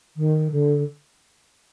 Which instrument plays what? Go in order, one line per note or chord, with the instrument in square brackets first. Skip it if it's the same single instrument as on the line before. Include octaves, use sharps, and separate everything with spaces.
[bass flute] D#3
D3